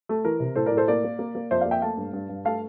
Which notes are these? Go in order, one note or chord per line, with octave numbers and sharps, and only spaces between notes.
A3
E3 A#4
C3
A2 A4 C5
A2 A#4 D5
A4 C5
A#3 A#4 D5
A#3
A#3
A#3
F2 C5 E5
D5 F5
A#3
E5 G5
A3 F5 A5
G2
G2
G2
A3 F5 A5